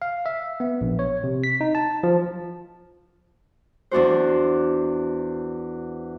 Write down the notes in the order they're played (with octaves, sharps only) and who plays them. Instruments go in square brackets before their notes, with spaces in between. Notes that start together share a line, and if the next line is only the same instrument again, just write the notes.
[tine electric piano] F5
E5
B3
A#1
C#5
C3
B6
D#4
A5
F3
[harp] E2 D4 F#4 C5